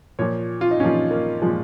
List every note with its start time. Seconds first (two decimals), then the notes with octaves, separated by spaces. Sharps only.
0.19 A#2 F3 C#5
0.61 F4
0.71 D#4
0.80 A#2 F3 C#4
1.11 A#3
1.42 A#2 F3 G#3